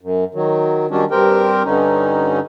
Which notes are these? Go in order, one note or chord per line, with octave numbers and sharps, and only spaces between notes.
F#2
D#3 F#3
D#3 F#3 G3 C#4 D4
G2 C4 G4 A#4 G5
G2 D3 C#4 D#4